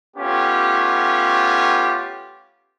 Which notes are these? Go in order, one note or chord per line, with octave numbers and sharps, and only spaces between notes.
A3 B3 C#4 F4 G4